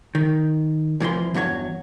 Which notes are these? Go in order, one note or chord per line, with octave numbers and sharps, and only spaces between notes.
D#3
C2 E3 F3 C6
E2 G2 F#3 C#5